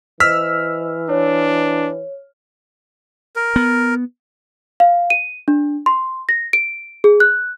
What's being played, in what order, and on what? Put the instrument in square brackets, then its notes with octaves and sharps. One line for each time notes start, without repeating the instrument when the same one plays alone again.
[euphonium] E3 [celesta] C5 D#5 [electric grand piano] E6 F6 B6
[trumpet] D4 [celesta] C#5
[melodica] A#4
[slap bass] B3
[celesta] F5
D#7
D4
C6
A#6
D7
G#4
F#6